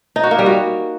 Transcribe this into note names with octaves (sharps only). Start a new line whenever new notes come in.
D#4
F#4
A#3
G3
F#4